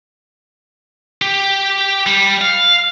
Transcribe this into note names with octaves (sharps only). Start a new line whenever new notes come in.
G4
G3
F5